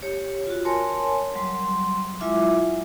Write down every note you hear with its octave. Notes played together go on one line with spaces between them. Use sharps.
G4 C#5
F4 F#4
A#4 C#5 G#5 A5 C6
F#3 G3 C6
F#3 G#3 E4 F4 E5 D6